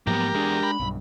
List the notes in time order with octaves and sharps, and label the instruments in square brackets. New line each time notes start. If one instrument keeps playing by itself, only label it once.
[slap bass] G#2 F3 F#3 [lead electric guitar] A#3 B3 [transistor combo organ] G4 A#4
[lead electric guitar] E2 G#4 [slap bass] G#3 D4
[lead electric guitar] B5
[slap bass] B1 G2